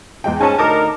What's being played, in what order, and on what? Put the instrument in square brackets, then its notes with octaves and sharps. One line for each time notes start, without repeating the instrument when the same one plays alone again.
[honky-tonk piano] E2 G#3 G5
[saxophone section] G#2 C#4 [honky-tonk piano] G#5 A5
[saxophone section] D2 D#4 A#4 [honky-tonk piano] A5 D6